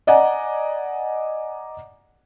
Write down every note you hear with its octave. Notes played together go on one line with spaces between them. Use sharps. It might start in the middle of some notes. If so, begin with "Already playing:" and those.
D5 D#5 F#5 G#5 A#5